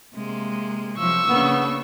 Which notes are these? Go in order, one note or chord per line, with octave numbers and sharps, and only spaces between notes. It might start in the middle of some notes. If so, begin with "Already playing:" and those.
C3 G#3 A#3
C3 F3 F#3 C#6 E6
C#3 A#3 B3 D4